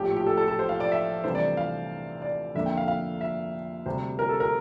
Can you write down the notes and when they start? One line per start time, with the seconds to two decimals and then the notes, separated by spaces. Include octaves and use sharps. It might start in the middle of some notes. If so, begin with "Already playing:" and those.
Already playing: A#1 A2 F3 G4
0.17 G4
0.26 A4
0.37 A4
0.48 A4
0.59 C5
0.69 F5
0.80 D5
0.92 E5
1.23 C2 C3 E3 A3 D4 C5
1.35 D5
1.57 F5
2.22 D5
2.55 F2 D3 F3 A#3 D4 E5
2.66 G5
2.77 F5
2.88 F5
3.21 E5
3.86 D2 C3 G3 C5
4.19 A#4
4.29 A4
4.40 A#4